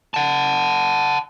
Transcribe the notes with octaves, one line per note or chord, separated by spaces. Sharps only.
F#5 A5